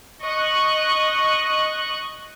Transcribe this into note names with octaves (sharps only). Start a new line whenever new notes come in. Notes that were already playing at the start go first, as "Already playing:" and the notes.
D#5 C#6 F#6